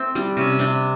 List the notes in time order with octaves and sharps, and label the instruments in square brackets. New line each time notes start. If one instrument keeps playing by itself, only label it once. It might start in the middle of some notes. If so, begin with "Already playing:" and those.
Already playing: [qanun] A3 C4
G3 D4
C3 C#4
C3 D4